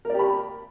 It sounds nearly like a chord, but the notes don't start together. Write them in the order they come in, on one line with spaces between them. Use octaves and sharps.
A#4 D5 G4 B5